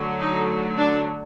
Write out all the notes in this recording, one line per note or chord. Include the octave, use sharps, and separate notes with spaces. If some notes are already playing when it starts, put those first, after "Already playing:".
Already playing: D3 F#3 A3
D#4
D4